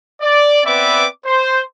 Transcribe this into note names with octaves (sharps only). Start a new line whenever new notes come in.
D5
B3 C4 B4 D5 E5 D6
C5